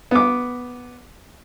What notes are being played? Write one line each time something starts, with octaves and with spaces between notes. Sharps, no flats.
B3 D6